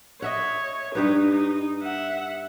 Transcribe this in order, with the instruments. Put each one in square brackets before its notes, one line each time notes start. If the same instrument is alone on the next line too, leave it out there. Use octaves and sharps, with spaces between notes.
[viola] C#5 [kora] D#5 E5 F#5
[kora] G2 G4 B4 [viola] D#4
[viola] D#4
E5 F#5